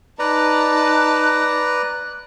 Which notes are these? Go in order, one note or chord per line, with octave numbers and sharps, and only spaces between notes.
D#4 B4 D5 A5 A#5 F#6